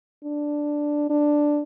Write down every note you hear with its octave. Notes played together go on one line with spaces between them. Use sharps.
D4
D4